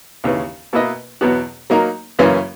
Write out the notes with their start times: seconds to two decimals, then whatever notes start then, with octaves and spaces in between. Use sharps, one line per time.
0.24 D#2 C#3 E3
0.73 B2 A#3 E4 B4 D#5
1.21 E2 B2 F#3 B3 F#4
1.70 F#3 A#3 D#4 A#4
2.19 F#2 C#3 E3 A#3 C#4